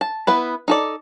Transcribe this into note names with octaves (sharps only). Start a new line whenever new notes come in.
A5
B3 E4 B4
D#4 A4 D5